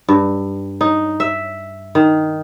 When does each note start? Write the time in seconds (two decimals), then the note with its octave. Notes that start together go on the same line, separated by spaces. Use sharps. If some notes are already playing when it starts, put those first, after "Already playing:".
0.08 G2
0.81 D#4
1.20 E5
1.95 D#3